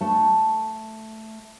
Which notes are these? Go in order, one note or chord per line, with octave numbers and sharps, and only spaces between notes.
A3 A5